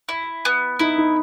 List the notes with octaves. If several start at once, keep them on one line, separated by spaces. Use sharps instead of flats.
E4
B3
D#4 E4
D#4